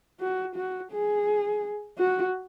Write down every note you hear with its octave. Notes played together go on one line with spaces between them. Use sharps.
F#4
F#4
G#4
F#4